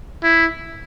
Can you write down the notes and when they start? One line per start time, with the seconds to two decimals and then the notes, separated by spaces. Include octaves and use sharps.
0.23 E4